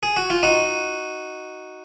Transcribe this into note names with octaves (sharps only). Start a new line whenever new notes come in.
G#4
F#4
F4
D#4 F#4